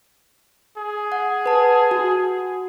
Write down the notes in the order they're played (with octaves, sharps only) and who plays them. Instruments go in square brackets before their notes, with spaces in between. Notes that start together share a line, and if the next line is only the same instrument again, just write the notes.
[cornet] G#4
[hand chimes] F#5
B4 A5
F#4